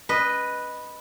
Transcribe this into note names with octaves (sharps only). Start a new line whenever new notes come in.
B4 D#5